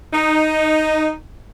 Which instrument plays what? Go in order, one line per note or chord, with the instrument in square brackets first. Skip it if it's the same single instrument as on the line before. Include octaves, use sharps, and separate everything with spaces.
[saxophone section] D#4